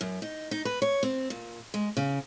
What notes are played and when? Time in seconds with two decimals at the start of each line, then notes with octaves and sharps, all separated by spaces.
0.01 F#2
0.22 D#4
0.51 D#4
0.65 B4
0.82 C#5
1.03 C4
1.30 A#2
1.74 G#3
1.97 C#3